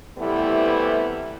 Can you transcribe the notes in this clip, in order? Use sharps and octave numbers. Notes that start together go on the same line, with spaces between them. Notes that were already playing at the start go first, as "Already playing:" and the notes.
C3 E3 G3 A3 B3 E4